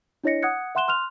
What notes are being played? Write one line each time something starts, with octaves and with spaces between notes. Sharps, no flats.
D4 E4 C#5 D#5 A#6 C#7
F#5 D#6 F#6 G#6 C#7
E5 F#5 C6 F#6 E7 G7
C6 F6 F#6 F7